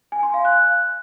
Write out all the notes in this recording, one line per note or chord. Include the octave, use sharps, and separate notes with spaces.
G#5
C6
F5
F#6